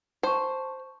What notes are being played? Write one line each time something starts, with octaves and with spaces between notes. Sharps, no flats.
C5 A5 C#6